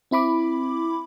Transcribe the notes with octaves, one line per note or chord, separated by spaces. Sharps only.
C4 E4 B5 D6